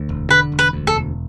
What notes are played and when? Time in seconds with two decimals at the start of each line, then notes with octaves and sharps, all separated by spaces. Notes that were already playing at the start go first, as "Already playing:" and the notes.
Already playing: D2
0.09 E1
0.30 D3 B4
0.52 E1
0.59 B4
0.73 D2
0.87 A4
0.94 E1